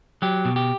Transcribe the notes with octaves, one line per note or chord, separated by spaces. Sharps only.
F#3 G4
B2
G4